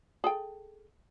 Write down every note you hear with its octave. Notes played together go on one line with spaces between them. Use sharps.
G#4 A4 G5